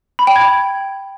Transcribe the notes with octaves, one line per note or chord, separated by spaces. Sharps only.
B5
G5
G#6